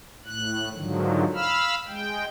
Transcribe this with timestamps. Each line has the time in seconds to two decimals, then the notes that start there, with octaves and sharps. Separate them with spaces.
0.26 A2 F#6
0.74 G#2 D3 D#3 F3 F#3
1.34 F5 B5 E6 F6
1.88 G#3 G5